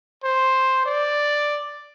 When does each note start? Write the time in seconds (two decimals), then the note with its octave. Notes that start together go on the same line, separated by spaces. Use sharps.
0.24 C5
0.86 D5